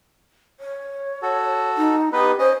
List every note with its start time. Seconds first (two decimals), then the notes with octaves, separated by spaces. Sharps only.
0.60 C#5
1.22 F#4 A4
1.77 D#4
2.13 B3 D#4 G4 B4
2.39 C#4 C5 D#5